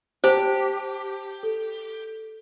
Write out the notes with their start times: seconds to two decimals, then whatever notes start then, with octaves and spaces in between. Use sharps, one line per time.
0.24 G4 C5 A5
1.43 A4